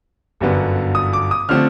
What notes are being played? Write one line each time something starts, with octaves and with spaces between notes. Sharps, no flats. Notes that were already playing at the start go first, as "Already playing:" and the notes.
G1 F#2 D3 F#3 B3
D#6
D6
D#6
D3 F3 A3 C4 F6